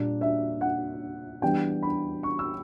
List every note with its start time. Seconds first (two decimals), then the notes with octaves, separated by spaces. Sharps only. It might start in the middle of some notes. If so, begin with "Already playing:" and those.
Already playing: A#2 G3 A#3 D4
0.21 E5
0.61 F#5
1.42 E3 G3 B3 D4 G5
1.83 B5
2.23 C#6
2.39 E6